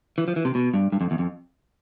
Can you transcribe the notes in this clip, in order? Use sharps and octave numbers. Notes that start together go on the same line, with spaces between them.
E3
F3
E3
C3
B2
G2
G2
F2
E2
F2